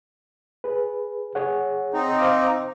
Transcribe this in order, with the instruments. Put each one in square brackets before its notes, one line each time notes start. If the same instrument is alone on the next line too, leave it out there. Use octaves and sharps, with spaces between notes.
[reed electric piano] G#4 B4
G#4 C#5 F#5
[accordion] C4 D#4
[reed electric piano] C5 F5 D6